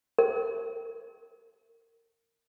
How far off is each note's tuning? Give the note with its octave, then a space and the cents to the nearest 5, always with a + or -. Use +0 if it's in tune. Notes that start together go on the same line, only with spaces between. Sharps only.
A#4 -25